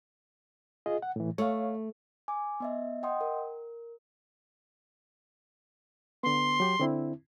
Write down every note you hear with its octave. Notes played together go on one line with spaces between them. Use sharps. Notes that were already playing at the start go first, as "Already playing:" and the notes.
F4 G#4 D#5
F#5
A2 E3
A3 C#5 F5
G#5 D6
B3 D#5 E5
D#5 F#5 G5 C6 D#6
A#4
D3 B3 C6
F#3 G4
D3 C4 E4